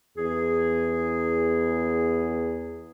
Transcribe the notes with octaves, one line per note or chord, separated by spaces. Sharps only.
E2 G#4